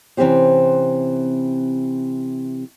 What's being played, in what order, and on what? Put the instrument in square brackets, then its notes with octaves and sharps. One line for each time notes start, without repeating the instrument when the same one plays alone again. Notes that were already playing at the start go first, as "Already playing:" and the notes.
[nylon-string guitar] C3 E3 C4 C#4 G4 C5